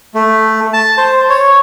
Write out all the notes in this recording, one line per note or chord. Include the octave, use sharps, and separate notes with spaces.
A3
A5
C5
C#5